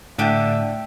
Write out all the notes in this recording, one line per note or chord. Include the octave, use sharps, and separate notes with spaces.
A2 D3 D4 G4 D5 E5